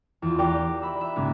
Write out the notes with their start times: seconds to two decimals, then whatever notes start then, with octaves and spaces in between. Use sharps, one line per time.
0.22 E2 F4
0.38 F#4 G4 A#4 D5 F5 G5
0.82 E5 B5 E6
1.01 E5
1.16 C#2 G#2 A#3 B3